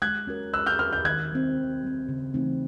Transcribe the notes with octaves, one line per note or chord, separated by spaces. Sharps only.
G#3 F#6 G#6
C#4 F#4 A#4
G#3 E6 F#6
F6 G6
C#4 F#4 A#4 F6 G6
F6 G6
D#3 F#6 G#6
G3 C4
D#3
G3 C4
C#3
E3 A3 C4 D#4